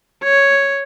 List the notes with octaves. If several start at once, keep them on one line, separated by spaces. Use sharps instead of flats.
C#5